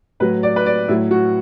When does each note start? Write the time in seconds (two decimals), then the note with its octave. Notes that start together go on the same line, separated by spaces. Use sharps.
0.20 A2 F#3 B4
0.43 D5
0.56 B4
0.66 D5
0.88 A2 F#3 E4
1.11 F#4